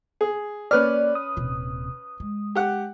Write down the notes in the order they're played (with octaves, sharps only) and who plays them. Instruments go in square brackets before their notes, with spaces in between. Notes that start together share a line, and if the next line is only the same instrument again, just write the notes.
[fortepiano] G#4
[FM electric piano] A#3 D5 [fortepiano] C#4 B4 F6
[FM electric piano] D#6
[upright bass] D#1 C3
G#3
[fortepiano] G4 F#5